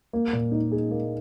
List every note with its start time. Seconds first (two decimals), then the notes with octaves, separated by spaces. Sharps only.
0.13 A#3
0.33 A#2
0.52 D#4
0.72 G#4
0.91 A#3